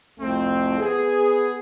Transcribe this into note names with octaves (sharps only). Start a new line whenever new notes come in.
C2 F2 A3 C4
B3 G#4